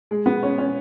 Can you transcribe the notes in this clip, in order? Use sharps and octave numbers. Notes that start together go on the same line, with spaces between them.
G#3
B3
C#4
C#4